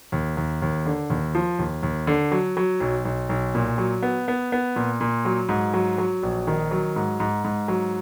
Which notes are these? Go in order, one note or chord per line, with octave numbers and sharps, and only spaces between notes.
D#2
D#2
D#2
D3
D#2
F3
D#2
D#2
D3
F#3
F#3
B1
B1
B1
A#2
F#3
B3
B3
B3
A#2
A#2
F#3
G#2
F#3
F#3
A#1
D#3
F#3
G#2
G#2
G#2
F#3